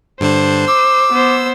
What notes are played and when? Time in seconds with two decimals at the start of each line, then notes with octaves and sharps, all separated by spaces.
0.20 G2 D3 D4 C5
0.68 D6 E6
1.11 B3 C5